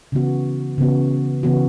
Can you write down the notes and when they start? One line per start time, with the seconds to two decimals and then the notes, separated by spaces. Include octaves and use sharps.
0.12 C#3 E3 B3 F#4
0.78 C#3 E3 B3 F#4
1.43 C#3 E3 B3 F#4